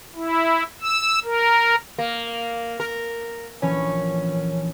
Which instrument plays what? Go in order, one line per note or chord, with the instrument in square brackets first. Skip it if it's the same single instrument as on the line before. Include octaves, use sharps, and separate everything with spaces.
[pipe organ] E4
E6
A#4
[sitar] A#3
A#4
[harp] A#1 E3 [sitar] C#4